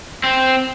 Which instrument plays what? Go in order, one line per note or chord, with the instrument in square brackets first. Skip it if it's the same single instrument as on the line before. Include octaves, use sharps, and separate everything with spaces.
[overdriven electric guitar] C4